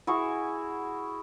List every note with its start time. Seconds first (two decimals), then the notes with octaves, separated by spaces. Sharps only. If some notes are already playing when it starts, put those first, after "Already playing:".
0.07 E4 F#4 G#4 C#6